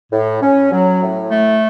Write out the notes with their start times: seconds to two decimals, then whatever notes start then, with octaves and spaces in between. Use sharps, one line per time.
0.12 A2
0.42 C#4
0.71 F#3
1.02 A2
1.31 A3